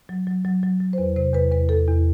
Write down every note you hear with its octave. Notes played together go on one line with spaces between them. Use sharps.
F#3
F#3
F#3
F#3
F#3
C5
E2 B4
C3 C5
E2 B4
E2 B4
E2 A4
E2